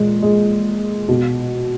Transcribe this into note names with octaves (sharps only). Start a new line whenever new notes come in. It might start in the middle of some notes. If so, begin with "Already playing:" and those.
Already playing: A#2 G#3
G#3
B2